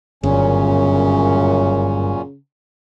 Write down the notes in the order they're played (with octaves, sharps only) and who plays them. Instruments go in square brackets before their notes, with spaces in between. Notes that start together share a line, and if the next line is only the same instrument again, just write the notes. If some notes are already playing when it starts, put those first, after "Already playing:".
[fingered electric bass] G1 [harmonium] F#2 A#2 C#4 [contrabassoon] C#3